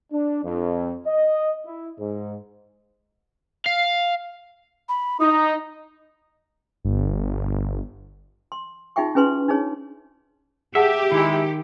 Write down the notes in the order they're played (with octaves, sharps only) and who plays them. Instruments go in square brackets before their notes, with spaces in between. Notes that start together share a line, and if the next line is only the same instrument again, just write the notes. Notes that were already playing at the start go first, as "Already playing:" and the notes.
[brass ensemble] D4
F2
D#5
E4
G#2
[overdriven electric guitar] F5
[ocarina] B5
[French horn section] D#4 [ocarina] D#6
[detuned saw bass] G1
[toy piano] C6
D#4 F4 G#4 E5 G5 C#6
C#4 E4 G#4 B4 G#5 C6
D4 D#4 G#4 C#5
[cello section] G4 [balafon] G#4 F#5 A5 [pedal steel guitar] E5
[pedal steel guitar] D#3 [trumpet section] G#3 E4